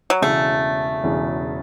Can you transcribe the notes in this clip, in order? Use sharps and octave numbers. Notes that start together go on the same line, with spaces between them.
F#3
E1 E2 C#3 A3
E1 E2 C#3